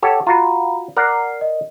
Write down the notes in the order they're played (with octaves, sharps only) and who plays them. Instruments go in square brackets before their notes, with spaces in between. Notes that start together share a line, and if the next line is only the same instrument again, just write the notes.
[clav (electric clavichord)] G4 A4 C#5 [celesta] F#5
[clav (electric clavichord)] F4 F#4 [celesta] A#5 B5
[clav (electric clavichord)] A#4 D5 F#5 [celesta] F6 C7
[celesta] D#5